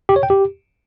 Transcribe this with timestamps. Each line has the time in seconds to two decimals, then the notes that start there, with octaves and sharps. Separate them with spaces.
0.09 G4
0.16 C#5
0.23 G5
0.30 G4